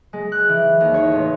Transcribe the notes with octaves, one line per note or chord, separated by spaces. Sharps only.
G#3
F#6
E3
D#2
C#5
A1